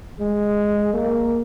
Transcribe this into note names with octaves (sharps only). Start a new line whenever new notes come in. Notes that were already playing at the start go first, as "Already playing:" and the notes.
G#3
A#3